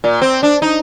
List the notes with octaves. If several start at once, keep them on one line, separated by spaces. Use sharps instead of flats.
A#2
C4
D4
D#4